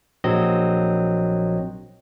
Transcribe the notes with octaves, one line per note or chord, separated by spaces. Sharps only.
A#1 F#3 C4 D#5